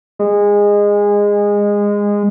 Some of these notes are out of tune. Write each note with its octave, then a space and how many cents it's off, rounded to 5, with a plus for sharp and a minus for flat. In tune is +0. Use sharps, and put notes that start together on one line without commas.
G#3 -20